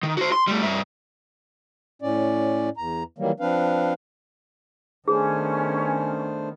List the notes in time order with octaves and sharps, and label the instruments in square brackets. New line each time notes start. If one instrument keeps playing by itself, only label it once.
[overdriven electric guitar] D#3
F#4 C5
C6
G3 A3
G2 E5
[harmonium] A2 C#4 D5
E2 A#5
D#3 E3 F#3 G3 A#3
F3 C4 D4 B4 F5
[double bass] D#3 B3 [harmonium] A3 D4 C5 [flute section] C#4 [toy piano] G#4